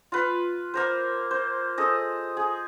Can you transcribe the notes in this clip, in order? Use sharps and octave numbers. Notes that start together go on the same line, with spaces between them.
F4 B4
A#3 A#4 C5
C5
G#4 A4 D#5
G#4